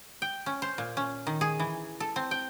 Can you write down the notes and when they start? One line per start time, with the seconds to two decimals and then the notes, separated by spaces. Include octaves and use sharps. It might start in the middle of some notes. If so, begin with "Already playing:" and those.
0.22 G5
0.46 C#4
0.62 C5
0.78 A#2
0.97 C#4
1.27 D#3
1.41 G#4
1.59 E3
2.00 A4
2.16 C4
2.31 G5